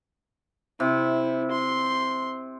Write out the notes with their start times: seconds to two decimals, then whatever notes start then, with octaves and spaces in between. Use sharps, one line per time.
0.80 C3 E4
1.51 C6